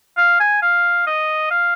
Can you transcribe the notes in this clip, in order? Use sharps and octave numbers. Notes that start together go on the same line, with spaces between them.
F5
G#5
F5
D#5
F5